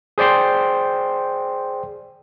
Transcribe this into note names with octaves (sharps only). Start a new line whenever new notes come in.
G#4 C5 D5 G5 C6